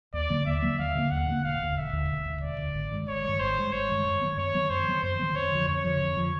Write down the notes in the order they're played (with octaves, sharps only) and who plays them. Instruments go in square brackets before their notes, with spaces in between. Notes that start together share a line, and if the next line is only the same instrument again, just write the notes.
[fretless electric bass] D#2 [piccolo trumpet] D5
[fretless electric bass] D3 F#3 A#3
[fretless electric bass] D#2 [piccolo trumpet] E5
[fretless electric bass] D3 F#3 A#3
[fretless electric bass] D#2 [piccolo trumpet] F5
[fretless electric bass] D3 F#3 A#3
[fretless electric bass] D#2 [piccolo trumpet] F#5
[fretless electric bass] D3 F#3 A#3
[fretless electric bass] E1 [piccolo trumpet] F5
[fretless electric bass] D2 D3
[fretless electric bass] E1 [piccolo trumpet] E5
[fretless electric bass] D2 D3
E1
D2 D3
[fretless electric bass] E1 [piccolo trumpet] D5
[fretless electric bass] D2 D3
G#1
G2 D#3 G#3
[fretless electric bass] G#1 [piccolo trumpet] C#5
[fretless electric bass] G2 D#3 G#3
[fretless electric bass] G#1 [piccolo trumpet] C5
[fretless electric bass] G2 D#3 G#3
[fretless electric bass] G#1 [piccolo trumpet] C#5
[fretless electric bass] G2 D#3 G#3
F#2
D#3 F#3 B3
[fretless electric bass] F#2 [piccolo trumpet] C#5
[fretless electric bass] D#3 F#3 B3
[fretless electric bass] F#2 [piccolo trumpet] C5
[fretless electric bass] D#3 F#3 B3
[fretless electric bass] F#2 [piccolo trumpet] C5
[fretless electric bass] D#3 F#3 B3
[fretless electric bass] F2 [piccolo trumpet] C#5
[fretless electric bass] D3 F3
[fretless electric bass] F2 [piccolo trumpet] C#5
[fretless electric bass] D3 F3
F2
D3 F3